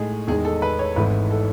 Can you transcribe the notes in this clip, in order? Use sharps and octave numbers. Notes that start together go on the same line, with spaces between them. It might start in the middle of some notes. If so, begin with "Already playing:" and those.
Already playing: A2 G#3 D#4 G#4
E2 D#3 G#3 D#4 G#4
A4
B4
C#5
G#1 G#2 E3 A3 E4 B4
A4